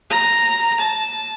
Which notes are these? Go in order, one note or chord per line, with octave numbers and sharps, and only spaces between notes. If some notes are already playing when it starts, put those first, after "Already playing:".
A#5
A5